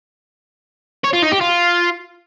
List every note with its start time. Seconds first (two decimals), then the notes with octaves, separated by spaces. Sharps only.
1.04 C#5
1.13 F4
1.23 D#4
1.32 G4
1.41 F4